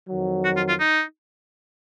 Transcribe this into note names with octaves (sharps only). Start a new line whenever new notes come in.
F2 D#3 F#3
F#4
F4
F4
D#4